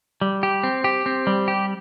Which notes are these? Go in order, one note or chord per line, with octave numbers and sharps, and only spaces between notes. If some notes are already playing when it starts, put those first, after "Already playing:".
G3
G4
C4
G4
C4
G3
G4